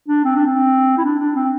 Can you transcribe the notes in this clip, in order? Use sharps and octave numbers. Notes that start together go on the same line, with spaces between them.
D4
C4
D4
C4
E4
D4
D4
C4